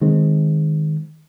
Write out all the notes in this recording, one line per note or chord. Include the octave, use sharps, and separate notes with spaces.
D#3 G#3 C4